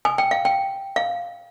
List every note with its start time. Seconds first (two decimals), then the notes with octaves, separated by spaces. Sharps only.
0.05 G#5
0.18 G5
0.31 F5
0.45 G5
0.96 F5